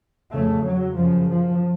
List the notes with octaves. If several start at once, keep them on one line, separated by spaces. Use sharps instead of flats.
F2 C#3 A3
F#3
F#2 C#3 F3
F3